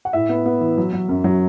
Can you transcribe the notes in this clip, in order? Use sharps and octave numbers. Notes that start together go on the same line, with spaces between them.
F#5
A2 E5
B3
B3
E3
F#3
F#3
F#2
F#3